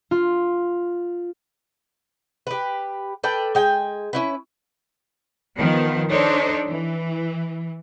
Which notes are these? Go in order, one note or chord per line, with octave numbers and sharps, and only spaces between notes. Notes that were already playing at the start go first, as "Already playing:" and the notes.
F4
G4 B4
A4 B4 D5 G5
G#3 G5 G#5
C#4 E4 B4
D#3 F3 B3
D4 D#4 A4 C5 C#5
E3